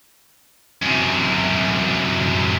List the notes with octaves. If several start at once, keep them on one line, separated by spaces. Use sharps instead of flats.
F#2 C3